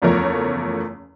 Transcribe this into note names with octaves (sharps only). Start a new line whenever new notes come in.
F#1 E2 F3 A3 A#4 C#5